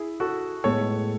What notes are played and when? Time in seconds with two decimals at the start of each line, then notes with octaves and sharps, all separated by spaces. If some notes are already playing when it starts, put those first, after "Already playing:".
Already playing: E4 G#4
0.20 F#4 A4
0.64 A2 G#3 B3 A4 C#5